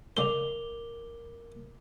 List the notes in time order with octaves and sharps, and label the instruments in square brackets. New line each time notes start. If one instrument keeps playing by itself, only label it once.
[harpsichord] C#3 G#3 C5 [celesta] A#4 D6 F7 [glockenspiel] G7